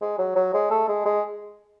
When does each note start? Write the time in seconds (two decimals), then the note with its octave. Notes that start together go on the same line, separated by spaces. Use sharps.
0.01 G#3
0.18 F#3
0.35 F#3
0.54 G#3
0.70 A3
0.88 G#3
1.05 G#3